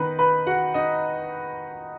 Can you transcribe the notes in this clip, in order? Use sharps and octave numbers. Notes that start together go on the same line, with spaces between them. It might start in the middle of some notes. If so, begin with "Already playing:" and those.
Already playing: D#3 B3 D#4 B4 B5
B4 B5
F#4 F#5
D#4 D#5